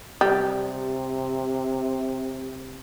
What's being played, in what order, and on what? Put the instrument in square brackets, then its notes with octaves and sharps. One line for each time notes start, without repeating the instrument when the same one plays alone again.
[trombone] C3 [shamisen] G3